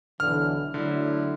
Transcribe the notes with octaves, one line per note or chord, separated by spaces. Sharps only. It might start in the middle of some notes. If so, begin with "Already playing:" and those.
B1 D3 E3 F6
D3 F#3 A3 E4